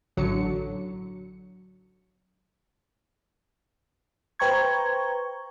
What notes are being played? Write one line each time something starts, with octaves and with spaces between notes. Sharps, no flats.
A1 D3 F#3 C#7
B4 C5 G5 A#5 C#6 G#6